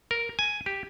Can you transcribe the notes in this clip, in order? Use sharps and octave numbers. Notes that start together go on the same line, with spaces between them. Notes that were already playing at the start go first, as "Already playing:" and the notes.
A#4
G#5
G4